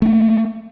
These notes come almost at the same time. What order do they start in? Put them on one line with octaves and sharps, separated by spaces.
A3 D4 A#3